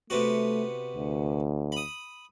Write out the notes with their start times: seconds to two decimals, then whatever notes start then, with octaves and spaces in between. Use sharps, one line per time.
0.10 C3 A3 B3 F#4
0.96 D2
1.72 B5 D#6